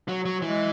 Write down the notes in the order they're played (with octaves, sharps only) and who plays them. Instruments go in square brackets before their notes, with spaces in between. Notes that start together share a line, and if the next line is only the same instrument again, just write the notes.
[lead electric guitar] F#3
F#3
[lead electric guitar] E3 [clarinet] G#3